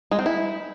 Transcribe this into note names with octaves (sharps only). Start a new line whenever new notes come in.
G#3
C4
E4